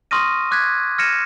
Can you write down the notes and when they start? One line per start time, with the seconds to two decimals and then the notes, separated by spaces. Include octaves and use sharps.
0.11 C6 C#6 D#6 F6 A#6 D#7
0.51 D6 F#6 G#6 B6
0.98 F6 G#6 A#6 C#7 D#7 E7